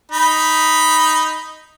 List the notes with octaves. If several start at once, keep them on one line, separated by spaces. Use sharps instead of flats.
D#4 B5